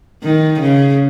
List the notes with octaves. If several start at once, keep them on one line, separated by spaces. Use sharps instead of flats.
D#3
C#3